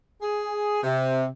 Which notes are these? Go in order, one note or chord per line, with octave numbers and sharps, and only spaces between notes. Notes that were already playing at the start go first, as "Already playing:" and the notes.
G#4
C3